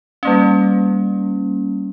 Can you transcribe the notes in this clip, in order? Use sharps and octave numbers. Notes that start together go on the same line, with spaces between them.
G3 A#3 C#4